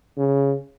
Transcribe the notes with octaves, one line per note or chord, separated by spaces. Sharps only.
C#3